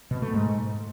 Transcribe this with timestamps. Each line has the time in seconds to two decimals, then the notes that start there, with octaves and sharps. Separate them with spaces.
0.11 B2
0.22 A3
0.33 G#2